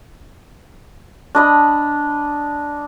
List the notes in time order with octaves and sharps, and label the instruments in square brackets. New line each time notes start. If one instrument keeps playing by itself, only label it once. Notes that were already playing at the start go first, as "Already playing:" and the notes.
[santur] D4 D#5 B5